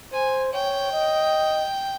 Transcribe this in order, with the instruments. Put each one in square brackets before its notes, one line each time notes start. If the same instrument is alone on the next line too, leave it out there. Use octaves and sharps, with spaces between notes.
[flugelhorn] C5 [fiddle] G#5
[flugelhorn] C#5 [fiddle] G5
[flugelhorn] D#5